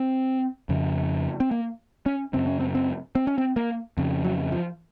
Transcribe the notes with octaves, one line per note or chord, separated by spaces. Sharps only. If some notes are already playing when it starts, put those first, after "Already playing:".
Already playing: C4
F2 C#3
C4
A#3
C#4
F#2 C#3 C4
C#4
C4
C4
C4
C#4
C4
A#3
F2 C#3
F#3
F3